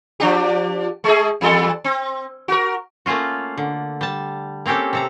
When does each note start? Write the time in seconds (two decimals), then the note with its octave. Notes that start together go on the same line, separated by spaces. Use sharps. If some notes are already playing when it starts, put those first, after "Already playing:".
0.20 F3 D4 G4
1.04 G#3 A3 G#4
1.41 E2 G3 A4
1.84 C4
2.48 F#4 A#4
3.06 A3 A#3 C#4 F4 F#4
3.58 D3
4.01 G3 A5
4.66 A#3 C4 C#4 G4 A4
4.93 C3 A4 A#5